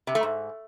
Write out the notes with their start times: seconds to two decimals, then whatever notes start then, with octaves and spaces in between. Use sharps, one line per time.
0.07 C3
0.15 A3
0.23 G#2